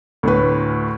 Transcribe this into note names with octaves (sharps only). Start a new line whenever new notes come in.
D2 A2 B4